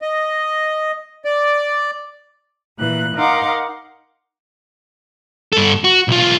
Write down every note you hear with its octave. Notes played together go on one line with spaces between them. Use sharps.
D#5
D5
A#2 E3 F#6
D#4 A#4 F5 F#5 C6 D6
G2 A4
F#4
B1 F4